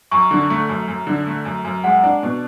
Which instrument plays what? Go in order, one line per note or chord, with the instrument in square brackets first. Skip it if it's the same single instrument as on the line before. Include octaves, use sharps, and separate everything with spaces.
[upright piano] F#2 [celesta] C#6
[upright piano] D3
A3
F#2
F#2
D3
A3
F#2
F#2
[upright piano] G#3 [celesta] F#5
[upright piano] D4
B2